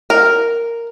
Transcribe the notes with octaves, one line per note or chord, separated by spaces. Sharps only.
A#4